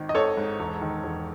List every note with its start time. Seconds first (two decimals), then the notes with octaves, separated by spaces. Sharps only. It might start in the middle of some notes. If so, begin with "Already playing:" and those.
Already playing: G#1 D#3
0.09 D#5
0.15 G#1 A4 C#5
0.37 G#2
0.59 E1
0.81 D#3
1.03 E1